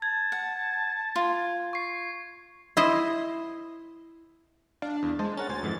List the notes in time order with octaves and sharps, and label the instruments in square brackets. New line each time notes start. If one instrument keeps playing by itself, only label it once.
[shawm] A5 [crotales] G#6
[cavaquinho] F#5
F4
[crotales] C#6 C7
[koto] E4 C5 D#5
[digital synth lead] D4 [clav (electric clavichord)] F5
[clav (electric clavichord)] E2
[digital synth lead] G#3 [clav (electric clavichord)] C5 A5
[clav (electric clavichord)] C#4 A#4 F#5 [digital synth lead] A6
[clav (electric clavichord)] D2 C5 G#5
F2 G#2 E3